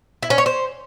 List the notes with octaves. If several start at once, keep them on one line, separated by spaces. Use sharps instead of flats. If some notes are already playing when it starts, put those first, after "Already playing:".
E4
C#4
C#5
C5